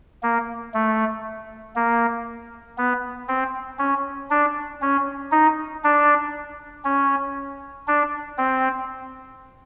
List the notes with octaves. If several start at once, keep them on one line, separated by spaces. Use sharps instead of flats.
A#3
A3
A#3
B3
C4
C#4
D4
C#4
D#4
D4
C#4
D4
C4